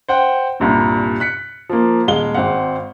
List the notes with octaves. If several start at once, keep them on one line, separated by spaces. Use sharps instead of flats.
C5 F#5 G5
C2 G2 A#2
F#6 B6 C#7
F3 A#3
D#1 G#3 F5 G7
G#1 C4 F5 F#5